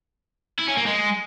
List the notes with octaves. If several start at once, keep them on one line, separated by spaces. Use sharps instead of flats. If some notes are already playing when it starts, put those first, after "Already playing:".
E4
C#4
A#3
G#3